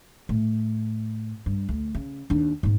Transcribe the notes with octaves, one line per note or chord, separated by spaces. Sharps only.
A2
G2
D2
C#3
D#2 D4
G#2 B3